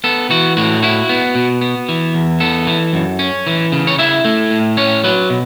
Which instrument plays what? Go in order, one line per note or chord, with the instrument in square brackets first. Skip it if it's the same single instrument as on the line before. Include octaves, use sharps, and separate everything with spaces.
[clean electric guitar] B3 A4
E3 F#4
A2 F#4
E4 F#4
B3
B2
B3
E3
E2
B3 A4
E3
F#2
C#4
E3
C#3
C#5
E4 E5
A3
A2
C#4 C#5
F#3 B4
B2